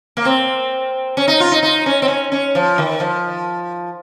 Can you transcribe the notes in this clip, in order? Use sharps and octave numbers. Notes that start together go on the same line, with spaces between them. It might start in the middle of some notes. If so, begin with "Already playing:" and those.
A#3
C4
C#4
D#4
F4
D#4
D#4
C#4
C4
C#4
C#4
F3
D#3
F3